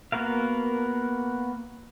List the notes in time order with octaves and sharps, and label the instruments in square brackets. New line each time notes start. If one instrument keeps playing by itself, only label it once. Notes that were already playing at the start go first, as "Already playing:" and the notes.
[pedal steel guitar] A#3 B3 F#4 A#4 F5